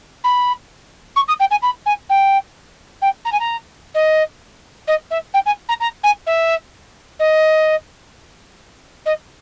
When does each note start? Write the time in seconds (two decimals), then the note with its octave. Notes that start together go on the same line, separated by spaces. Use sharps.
0.24 B5
1.16 C#6
1.28 D#6
1.39 G5
1.50 G#5
1.62 B5
1.85 G#5
2.09 G5
3.01 G5
3.25 A#5
3.32 G#5
3.40 A#5
3.94 D#5
4.87 D#5
5.10 E5
5.34 G5
5.45 G#5
5.68 A#5
5.80 A#5
6.03 G#5
6.26 E5
7.19 D#5
9.05 D#5